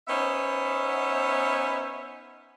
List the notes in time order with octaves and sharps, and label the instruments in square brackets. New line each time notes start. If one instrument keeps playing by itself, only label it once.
[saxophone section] B3 C#4 D#4 C5 E5